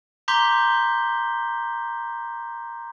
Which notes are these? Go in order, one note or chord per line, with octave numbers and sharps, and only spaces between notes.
A#5 C6 D6 G6 B6 G7